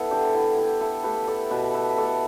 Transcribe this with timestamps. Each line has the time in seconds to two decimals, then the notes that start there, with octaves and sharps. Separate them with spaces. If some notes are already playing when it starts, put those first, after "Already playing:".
Already playing: B3 E4 A4
0.11 D3 G4
0.34 E4
0.58 E4 G4
0.81 E4 A4
1.04 A3 G4 B4
1.27 A4 D5
1.50 B2 B4 E5
1.74 B4 E5
1.97 A3 A4 D5